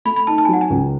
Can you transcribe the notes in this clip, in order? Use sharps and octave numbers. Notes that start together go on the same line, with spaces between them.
A3 B5
B5
D#4 A5
A5
G#5
F#3 F#5
G#5
C#2